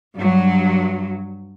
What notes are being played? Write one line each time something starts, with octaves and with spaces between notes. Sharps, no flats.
G2 F#3